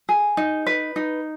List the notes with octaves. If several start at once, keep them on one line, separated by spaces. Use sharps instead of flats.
G#4
D#4
B4
D#4